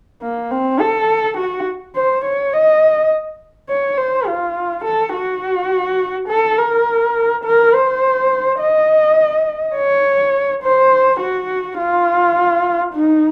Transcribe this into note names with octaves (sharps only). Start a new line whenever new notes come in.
A#3
C4
A4
F#4
C5
C#5
D#5
C#5
C5
F4
A4
F#4
A4
A#4
A#4
C5
D#5
C#5
C5
F#4
F4
D#4